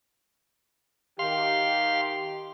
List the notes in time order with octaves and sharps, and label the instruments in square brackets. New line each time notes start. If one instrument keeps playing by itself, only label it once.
[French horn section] D#3 G4 [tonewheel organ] F5 C6